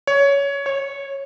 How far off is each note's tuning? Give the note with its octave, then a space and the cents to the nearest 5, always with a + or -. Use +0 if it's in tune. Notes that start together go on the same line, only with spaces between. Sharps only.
C#5 +15
C#5 -15